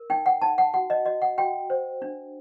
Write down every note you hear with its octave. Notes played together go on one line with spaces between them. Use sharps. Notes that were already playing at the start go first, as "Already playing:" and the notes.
Already playing: A#4
D#4 G5
F#5
D#4 A5
F#5
F#4 F#5
D#5
F#4 D#5
F#5
F#4 G5
C5
D4